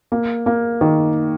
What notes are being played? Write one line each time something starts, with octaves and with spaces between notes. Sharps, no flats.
A#3
A#3
D#3